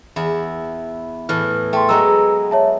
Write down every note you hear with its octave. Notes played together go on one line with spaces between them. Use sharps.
E2 E4
A2 E3 F6
A3 G5 C6
F#3 G#3 B3 B4 A#5 E6
C#5 E5 A5